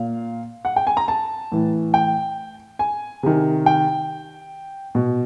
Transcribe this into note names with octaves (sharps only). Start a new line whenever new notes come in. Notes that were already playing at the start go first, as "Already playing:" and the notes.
Already playing: A#2 F5
F#5
G5
G#5
A#5
A5
A2 E3
G5
G#5
C3 D#3
G5
B2